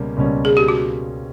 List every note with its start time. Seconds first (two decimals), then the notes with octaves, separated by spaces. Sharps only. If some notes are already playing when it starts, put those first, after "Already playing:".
Already playing: C#2 B2 G3 A#3 C#4
0.17 C#2 B2 G3 A#3 C#4
0.45 G#4
0.57 G4
0.68 F#4